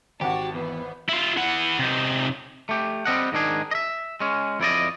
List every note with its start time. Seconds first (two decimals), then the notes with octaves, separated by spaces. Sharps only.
0.21 G#1 F#4 G4 F#5 A5
0.54 E2 B3
1.09 E4 F4
1.37 E4 F#5
1.79 C3 D#4
2.69 A3 G4
3.05 G3 C4 D#5 F#5
3.32 G#2 D#3 D4 G#4
3.71 D#5 E5
4.20 G#3 C#4
4.60 F2 E4 D5 D#5